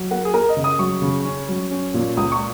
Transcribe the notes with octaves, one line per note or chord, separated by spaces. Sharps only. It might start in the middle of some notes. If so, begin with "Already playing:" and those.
Already playing: F#3
A#3 F#5
G#4
A#3 A#4
D#5
C#3
D#6
F#3 C#6
C#3
C#4
F#3
C#4
A#2
C#2 D#6
C#6